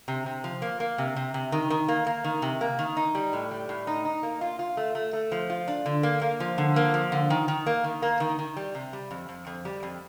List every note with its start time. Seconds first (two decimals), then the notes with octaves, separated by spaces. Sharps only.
0.08 C3
0.26 C3
0.44 F3
0.62 A#3
0.80 A#3
0.98 C3
1.16 C3
1.34 C3
1.52 D#3
1.70 D#3
1.88 A#3
2.07 A#3
2.24 D#3
2.42 C3
2.61 A#3
2.79 D#3
2.97 D#4
3.15 G3
3.33 A2
3.51 G3
3.69 A2
3.87 D#4
4.05 D#4
4.23 A#3
4.41 F4
4.59 F4
4.77 A3
4.95 A3
5.13 A3
5.32 F3
5.50 F4
5.68 D4
5.86 D3
6.03 A#3
6.22 A#3
6.40 F3
6.58 D3
6.76 A#3
6.94 F3
7.12 D3
7.30 D#3
7.48 D#3
7.66 A#3
7.84 D#3
8.02 A#3
8.20 D#3
8.39 D#3
8.57 G3
8.75 C3
8.93 G3
9.11 F2
9.29 F2
9.47 F2
9.65 G3
9.83 F2